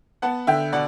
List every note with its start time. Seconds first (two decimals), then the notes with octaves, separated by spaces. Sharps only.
0.22 B3 F#5 A5
0.47 D3 E5 G5
0.72 B2 D5 F#5